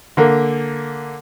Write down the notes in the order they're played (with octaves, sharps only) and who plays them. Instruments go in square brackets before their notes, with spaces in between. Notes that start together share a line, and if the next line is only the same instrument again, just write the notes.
[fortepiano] D3 A#3